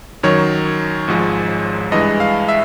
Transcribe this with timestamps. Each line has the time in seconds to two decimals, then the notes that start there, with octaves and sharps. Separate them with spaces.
0.23 F#2 D#3 F#3 C#5
1.08 G#1 G#2 F3 G#3
1.92 G2 E3 G#3 D#5
2.20 F5
2.49 E5